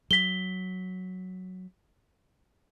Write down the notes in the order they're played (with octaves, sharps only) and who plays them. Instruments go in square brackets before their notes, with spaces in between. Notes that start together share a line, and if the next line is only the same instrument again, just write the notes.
[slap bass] F#3 [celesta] B6 G7